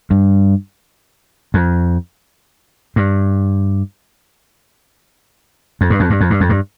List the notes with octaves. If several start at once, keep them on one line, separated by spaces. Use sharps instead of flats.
G2
F2
G2
F2
G2
F2
G2
F2
G2
F2
G2